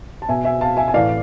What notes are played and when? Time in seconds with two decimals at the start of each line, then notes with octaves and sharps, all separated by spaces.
0.22 A5
0.28 B2 E5 G#5
0.45 E5 G#5
0.61 F5 A5
0.77 E5 G#5
0.88 G#5
0.94 A2 E3 D5 F5